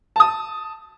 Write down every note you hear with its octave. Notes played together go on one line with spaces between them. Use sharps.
A5 D#6